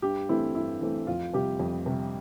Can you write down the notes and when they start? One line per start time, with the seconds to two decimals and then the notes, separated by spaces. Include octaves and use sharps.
0.02 G2 G4
0.29 E3 A3 C4 E4
0.55 G2 E4
0.81 E3 A3 C4
1.07 F2 F4
1.33 C3 G3 G4
1.60 F2
1.86 C3 G3